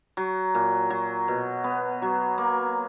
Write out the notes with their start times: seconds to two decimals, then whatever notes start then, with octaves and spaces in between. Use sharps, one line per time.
0.17 F#3
0.55 A#2
0.90 F#3
1.28 B2
1.64 B3
2.02 F#3
2.38 A#3